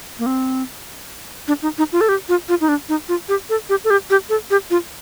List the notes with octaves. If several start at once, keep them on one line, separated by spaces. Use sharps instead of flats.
A#3
C4
D4
D#4
D#4
F4
A4
G4
F4
F4
D#4
D4
D#4
F4
G4
A4
G4
A4
G4
G4
A4
G4
F4